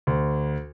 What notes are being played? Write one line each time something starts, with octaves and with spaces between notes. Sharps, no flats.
D2